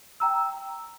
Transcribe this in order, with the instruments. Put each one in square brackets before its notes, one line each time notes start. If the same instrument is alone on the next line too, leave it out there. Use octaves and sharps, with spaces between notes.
[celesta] G5 A#5 E6